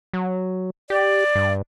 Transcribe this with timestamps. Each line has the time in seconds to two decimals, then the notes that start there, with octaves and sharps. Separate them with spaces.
0.13 F#3
0.90 G4 D5
1.35 G2